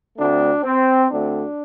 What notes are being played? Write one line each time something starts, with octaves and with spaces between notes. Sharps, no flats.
D2 D3 A3 C4 D4
C4
D2 D3 A3 C4 D4